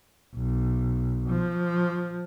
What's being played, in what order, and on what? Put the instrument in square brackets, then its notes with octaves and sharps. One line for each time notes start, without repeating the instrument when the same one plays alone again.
[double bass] B1
F3